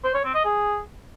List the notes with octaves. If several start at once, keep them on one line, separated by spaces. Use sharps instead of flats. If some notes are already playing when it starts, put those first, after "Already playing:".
C5
C#5
C4
D#5
G#4